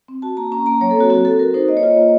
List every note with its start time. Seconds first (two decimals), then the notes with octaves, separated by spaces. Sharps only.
0.08 C4
0.22 F#4 A5
0.37 A#3 A#5
0.52 C#4 A#5
0.66 A#3 A#5
0.81 F#3 C#5
0.91 A4
0.95 C4 F#4
1.10 C4 F#4
1.25 F#4 A4
1.39 F#4 A#4
1.54 D#4 C5
1.68 A#3 D#5
1.77 C#5
1.83 F4 D#5
1.97 A#3